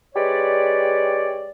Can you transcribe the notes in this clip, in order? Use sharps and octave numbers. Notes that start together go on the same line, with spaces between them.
G#3 G4 B4 C#5 D5